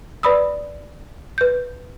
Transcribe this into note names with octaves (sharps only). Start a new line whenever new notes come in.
B4 D5 B5 D#6 E6
B4 G6